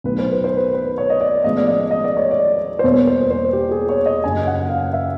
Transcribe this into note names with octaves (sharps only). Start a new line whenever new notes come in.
B1 A2 F#3 B4
C5
B4
C5
B4
B4
C#5
D#5
D5
A1 A2 F3 G#3 B3 D#5
D5
D#5
D#5
D5
C#5
D5
C5
E2 B2 G3 A#3 C#5
C5
C5
G4
G#4
C#5
D#5
F#1 F#2 C#3 G#5
F#5
F5
E5